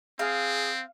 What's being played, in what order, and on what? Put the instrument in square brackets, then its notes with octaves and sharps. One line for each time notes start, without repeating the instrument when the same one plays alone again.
[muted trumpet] C4 [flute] G#4 [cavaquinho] F5